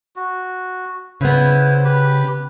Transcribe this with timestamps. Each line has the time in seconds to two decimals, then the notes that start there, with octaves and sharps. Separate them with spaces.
0.16 F#4
1.21 C#3 B3 E4 B4 C5
1.84 G4 B4